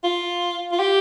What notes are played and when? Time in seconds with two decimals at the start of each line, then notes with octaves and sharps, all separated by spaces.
0.04 F4
0.72 F4
0.80 G4